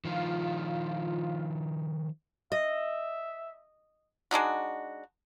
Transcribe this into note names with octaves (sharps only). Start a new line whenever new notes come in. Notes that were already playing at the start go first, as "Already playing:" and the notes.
D#3 F3 F4
D#5 E5
G#3 D4 D#4 F#4